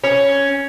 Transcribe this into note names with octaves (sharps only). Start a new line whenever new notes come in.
C#4